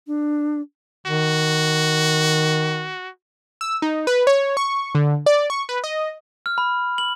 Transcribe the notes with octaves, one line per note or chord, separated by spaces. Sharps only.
D4
D#3 F#4
E6
D#4
B4
C#5
C#6
D3
D5
C#6
B4
D#5
F6
B5
F#7